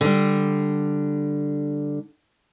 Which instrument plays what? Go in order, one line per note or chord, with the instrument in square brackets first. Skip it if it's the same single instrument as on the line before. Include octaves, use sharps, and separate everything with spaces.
[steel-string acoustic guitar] D3 G3